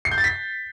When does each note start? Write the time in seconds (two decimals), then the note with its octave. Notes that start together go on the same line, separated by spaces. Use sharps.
0.05 C7
0.11 G6
0.18 A6
0.24 B6